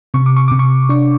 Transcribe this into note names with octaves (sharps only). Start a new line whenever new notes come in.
C3 C#6
D6
C#6
C3 D6
C#6
D4 C#6